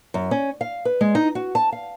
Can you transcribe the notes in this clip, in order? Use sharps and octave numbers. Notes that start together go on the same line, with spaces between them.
F#2
C#4
F5
B4
G#3
D#4
F#4
A5
F5